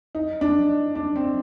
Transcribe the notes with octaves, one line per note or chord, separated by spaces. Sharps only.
D#4
D4
D4
C4